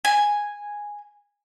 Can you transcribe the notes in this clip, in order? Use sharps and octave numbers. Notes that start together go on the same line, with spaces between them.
G#5